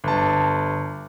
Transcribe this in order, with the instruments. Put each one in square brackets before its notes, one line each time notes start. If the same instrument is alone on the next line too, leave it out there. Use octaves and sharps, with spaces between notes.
[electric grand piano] G1 A5